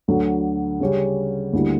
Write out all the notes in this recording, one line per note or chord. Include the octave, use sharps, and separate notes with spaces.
D2 D3 F#3
C#3 G3 C#4 G4
D2 D3 G3 A#3 E4